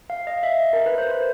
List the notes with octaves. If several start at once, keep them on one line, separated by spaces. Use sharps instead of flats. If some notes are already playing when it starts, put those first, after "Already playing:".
F5
D#5
E5
A#4
B4
C5
C5